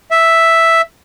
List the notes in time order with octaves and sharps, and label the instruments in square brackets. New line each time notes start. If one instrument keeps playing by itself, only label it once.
[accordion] E5